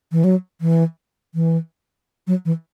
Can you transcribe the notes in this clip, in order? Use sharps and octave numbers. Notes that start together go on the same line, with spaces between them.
E3
F#3
E3
E3
F#3
E3